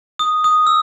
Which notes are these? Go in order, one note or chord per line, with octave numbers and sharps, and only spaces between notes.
D#6
D#6
E6